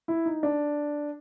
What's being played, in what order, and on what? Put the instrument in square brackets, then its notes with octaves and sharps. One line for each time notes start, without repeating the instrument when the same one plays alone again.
[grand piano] E4
D#4
D4